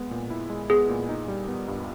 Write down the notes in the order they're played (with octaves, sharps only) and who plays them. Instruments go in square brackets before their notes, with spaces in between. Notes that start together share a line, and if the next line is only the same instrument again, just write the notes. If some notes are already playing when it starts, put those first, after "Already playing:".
Already playing: [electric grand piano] G#3 B3
A#2
E4
G#3
[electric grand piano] B3 [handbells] G#4
[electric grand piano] A#2
D#4
G3
B3
G2